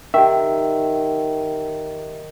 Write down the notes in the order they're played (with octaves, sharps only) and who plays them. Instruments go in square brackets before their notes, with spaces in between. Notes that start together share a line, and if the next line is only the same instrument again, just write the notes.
[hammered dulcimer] D#3 [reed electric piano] G4 E5